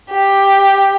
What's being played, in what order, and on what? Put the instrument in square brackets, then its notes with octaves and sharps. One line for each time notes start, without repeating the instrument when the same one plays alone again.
[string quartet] G4